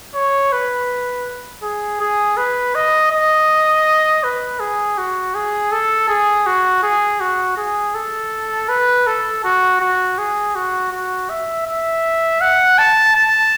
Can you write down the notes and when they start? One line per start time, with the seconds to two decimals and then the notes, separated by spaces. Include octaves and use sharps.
0.15 C#5
0.52 B4
1.63 G#4
2.01 G#4
2.37 B4
2.75 D#5
3.11 D#5
4.24 B4
4.60 G#4
4.98 F#4
5.35 G#4
5.72 A4
6.09 G#4
6.46 F#4
6.83 G#4
7.21 F#4
7.57 G#4
7.95 A4
8.69 B4
9.07 A4
9.44 F#4
9.81 F#4
10.18 G#4
10.55 F#4
10.92 F#4
11.30 E5
11.66 E5
12.41 F#5
12.78 A5
13.16 A5